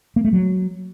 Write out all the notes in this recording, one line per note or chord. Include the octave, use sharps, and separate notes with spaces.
A#3
A3
F#3